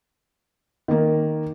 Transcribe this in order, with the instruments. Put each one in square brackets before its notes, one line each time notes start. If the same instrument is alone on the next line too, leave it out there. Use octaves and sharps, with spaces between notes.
[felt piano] D#3 A#3